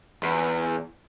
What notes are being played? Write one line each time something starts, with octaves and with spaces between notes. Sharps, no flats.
E2